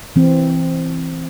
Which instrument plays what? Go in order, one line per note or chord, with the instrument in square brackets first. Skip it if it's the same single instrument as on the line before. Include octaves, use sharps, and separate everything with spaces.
[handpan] E3 C4